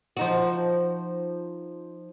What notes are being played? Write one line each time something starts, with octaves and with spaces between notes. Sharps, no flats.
F3 D#4 F#4